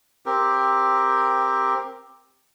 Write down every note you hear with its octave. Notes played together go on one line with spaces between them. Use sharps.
C4 G4 A#4